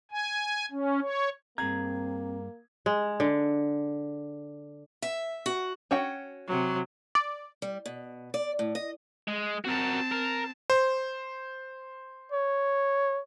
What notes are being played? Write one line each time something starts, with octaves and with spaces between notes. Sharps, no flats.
G#5
C#4
C#5
G2 A#3 C4 G#4 A#5 G#6
G#3
D3
E5
F#4
C#4 F#4 G5
C3 F#3
D5
G3
B2
D5
A2
D#5
G#3
C4 F#4 A#4 A5
A#4
C5
C#5